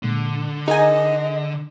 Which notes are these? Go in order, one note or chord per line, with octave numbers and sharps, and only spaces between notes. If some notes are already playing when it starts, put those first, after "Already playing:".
A#2 D3 G#3
D#4 G#4 A#4 D#5 F#5 G#5